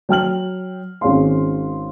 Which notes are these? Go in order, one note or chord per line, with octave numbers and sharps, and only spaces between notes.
F#3 G5 F6 F#7
G#1 C#4 G#4 F5 C6